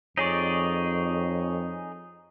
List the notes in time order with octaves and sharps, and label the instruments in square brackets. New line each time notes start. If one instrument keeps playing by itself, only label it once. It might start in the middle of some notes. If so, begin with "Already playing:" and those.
[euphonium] F2 [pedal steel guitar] D#4 G#4 D5 [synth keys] C#5 C#6